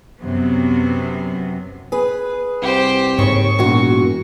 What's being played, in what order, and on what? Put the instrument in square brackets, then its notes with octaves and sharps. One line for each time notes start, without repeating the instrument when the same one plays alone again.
[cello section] F#2 C3 B3
[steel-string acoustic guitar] G#4 B4
[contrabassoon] C2 [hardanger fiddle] G4 C5
[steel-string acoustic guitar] D#2 C#3 [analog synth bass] G#2 [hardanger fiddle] C#6
[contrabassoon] E1 [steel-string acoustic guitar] A#2 F#4